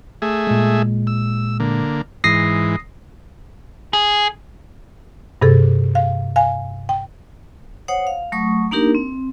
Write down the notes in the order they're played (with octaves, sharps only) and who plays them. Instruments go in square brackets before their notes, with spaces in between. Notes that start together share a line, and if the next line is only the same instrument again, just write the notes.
[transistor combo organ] A3 G#4 E5
[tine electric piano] A#2 G#3
[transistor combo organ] E6
D3 A#3
[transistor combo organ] G#2 E3 [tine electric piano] D#6 A#6 C7
[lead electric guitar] G#4
[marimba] G2 C3 G#4 A4
F5
F5 G#5
G5
[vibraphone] C5 C#5 F#5 D#6
F5
F#3 A3 C#6 D#6
A#3 D4 D#4 G4 A#4
C4